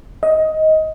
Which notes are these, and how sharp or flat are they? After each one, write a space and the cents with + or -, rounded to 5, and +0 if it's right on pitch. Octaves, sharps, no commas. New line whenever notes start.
D#5 +15